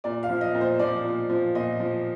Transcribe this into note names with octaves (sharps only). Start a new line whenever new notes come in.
A#2 D5
F5
F3
D#5
A#2
C5
F3 D5
A#2
F3
A#2 D#5
F3